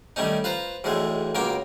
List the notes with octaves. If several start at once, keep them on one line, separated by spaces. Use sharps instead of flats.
D#3 G3 A3 C#4 D#4
F4 B4 C5 A#5
B1 E2 A2 G#3 A3
C#2 F#3 A#3 A#4 G5 D6